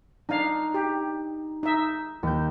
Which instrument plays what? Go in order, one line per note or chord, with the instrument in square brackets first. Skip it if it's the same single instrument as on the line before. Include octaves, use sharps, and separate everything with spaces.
[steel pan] D4 F5 [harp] D#4
[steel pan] G4
D#4 E5
[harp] D#2 G6